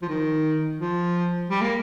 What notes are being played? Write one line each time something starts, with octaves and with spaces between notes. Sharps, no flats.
F3
D#3
F3
G3
A#3